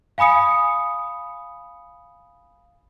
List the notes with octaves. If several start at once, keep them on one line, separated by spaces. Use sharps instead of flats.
F5 G#5 B5 D#6 C#7